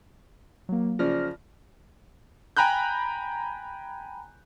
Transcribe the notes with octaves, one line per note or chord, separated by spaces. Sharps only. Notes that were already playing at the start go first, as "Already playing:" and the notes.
F#3 A#3
C#3 F3 D5 F6 A#6
G5 G#5 A#5 B5 F#6 G6